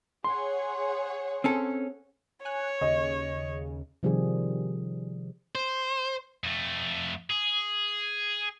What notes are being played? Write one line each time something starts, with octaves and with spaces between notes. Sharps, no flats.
G#4 C#5 F#5 C6
C4 C#4 A4
C#5 G#5 F#6
D#2 C#3 D#5
C3 D#3 F3 G3 G4 G#4
C5
F2 A3
G#4